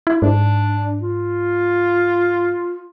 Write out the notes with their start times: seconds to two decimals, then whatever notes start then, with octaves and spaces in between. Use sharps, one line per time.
0.07 E4
0.22 G#2 D4
1.02 F4